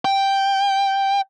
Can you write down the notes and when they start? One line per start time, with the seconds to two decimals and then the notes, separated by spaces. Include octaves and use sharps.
0.05 G5